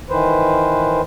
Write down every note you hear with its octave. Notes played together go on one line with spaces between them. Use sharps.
D#3 E3 B4 C5